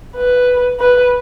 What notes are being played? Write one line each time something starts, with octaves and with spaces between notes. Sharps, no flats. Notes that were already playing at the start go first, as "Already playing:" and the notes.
B4
B4